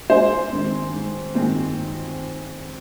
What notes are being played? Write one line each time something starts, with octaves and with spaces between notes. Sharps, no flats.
G#2 G#4 C5
D#3 G#3 C4
G#2
D#3 G#3 C4